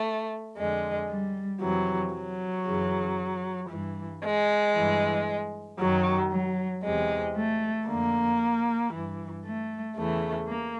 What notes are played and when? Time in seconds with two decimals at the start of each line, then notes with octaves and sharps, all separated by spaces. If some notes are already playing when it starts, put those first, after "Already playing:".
Already playing: A3
0.58 F2 D3 G#3
1.10 G3
1.62 F2 C3 E3 F#3
2.15 F#3
2.67 F#2 C#3 E3
3.71 G2 E3
4.24 G#3
4.76 G2 E3
5.80 F#2 D#3 F#3
6.32 F#3
6.84 E2 C3 E3 G#3
7.36 A3
7.88 F2 D3 A#3
8.94 G2 E3
9.46 A3
9.97 E2 C#3 E3 A3
10.49 A#3